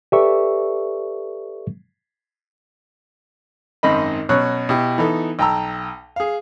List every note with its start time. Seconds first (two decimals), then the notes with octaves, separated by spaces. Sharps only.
0.12 G4 A4 B4 D5 E5 C#6
3.83 G#1 F#2 C4 D#4 D#5 B5
4.29 B2 F#3 C#4 C#5 F#6
4.69 B2 E4 G4
4.98 E3 B3 D#4 A4
5.39 B1 G5 A5 A#5 E6
6.16 G#4 F5